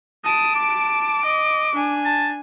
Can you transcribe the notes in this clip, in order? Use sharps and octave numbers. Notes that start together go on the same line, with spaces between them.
A5 D#6 D7
D6
D#5
D4 G#5
A5